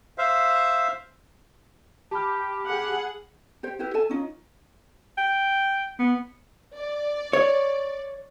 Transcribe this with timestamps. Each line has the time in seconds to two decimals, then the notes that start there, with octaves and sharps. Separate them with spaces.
0.18 C5 E5 F5
2.11 G4 A5 B5 F6
2.66 G#4 F#5
3.63 G4 C5 G5
3.79 E4 G4 B4
3.94 A4 E5 G#5 A5
4.09 C#4 D#4 F4
5.18 G5
5.99 B3
6.75 D5
7.33 C#5